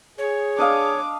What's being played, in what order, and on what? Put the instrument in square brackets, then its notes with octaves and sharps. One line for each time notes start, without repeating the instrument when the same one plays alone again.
[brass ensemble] G#4 [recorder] C#5
[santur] D4 D#5 F5 [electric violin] D6